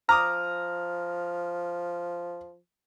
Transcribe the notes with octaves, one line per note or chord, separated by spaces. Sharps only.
F3 A#5 D6 D#6 F6